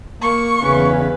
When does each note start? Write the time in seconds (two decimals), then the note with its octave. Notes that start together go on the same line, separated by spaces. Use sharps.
0.22 A#3 C#6
0.62 E2 C#3 C#4 B4